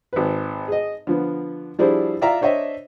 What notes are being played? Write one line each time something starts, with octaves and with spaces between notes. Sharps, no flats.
G#1 B4
G#4 D#5
D3 F3 B3
F3 G3 D4 E4 G#4 C5
F4 D5 E5 F5 A#5
D4 C5 C#5 D#5 E5